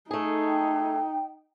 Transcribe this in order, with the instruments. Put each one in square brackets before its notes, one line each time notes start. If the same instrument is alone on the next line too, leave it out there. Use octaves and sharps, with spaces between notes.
[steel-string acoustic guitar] A3 G#4 [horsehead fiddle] D#4
[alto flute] G5